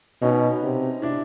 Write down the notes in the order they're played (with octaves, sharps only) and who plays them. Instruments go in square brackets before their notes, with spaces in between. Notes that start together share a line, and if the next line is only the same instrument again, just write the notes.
[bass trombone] B2 [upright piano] C#4 D#4
[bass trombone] C3
[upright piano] D4 E4